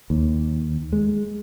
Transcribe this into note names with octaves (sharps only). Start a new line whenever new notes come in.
D#2
G#3